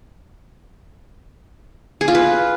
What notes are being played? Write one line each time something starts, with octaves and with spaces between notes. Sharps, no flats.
G#4
F4
B4